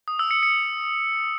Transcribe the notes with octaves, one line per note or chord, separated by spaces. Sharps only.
D#6
E6
C#7
C#7